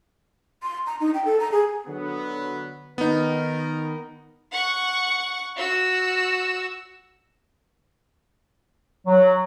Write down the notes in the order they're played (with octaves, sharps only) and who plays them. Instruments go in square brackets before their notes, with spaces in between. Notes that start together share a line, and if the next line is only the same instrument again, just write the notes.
[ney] C6
A#5
D#4
G5
A4
A#5
G#4
[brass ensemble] D3 F#3 B3
[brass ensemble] D#3 A#4 [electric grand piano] B3 D#4
[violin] F#5 C#6
F#4 E6
[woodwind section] F#3